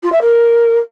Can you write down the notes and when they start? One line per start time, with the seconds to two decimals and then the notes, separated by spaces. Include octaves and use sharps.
0.03 F4
0.12 E5
0.21 A#4